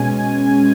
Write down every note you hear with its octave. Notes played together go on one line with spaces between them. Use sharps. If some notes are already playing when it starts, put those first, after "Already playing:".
Already playing: B2 G#3 C#4 G#5